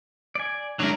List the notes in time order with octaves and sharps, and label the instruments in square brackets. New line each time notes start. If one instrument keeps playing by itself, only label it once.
[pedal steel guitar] D5 G#5
[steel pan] D3 G#3 C#4 [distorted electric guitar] F#3 A#4 [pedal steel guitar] D4 E4